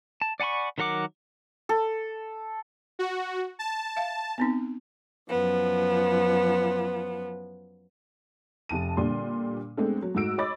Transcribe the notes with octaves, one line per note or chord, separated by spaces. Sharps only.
A5
D5 F#5 G#5 B5 C#6
D#3 F#3 A#4 F#5 D6
A4
F#4
A5
E5 F5
B3 C4 D#4
F#2 F3 B3
F1 A5 D#7
A#2 D3 G3 D5 C6
G#3 A3 B3 C4 D4 A4
F#3
G#2 A3 F#4 E6 D7
C#5 D#5 B5 D6 A6